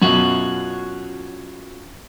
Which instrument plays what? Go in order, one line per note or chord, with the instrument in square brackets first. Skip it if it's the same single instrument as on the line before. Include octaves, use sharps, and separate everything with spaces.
[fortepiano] F#2 B2 [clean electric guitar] C#4 F4 F#4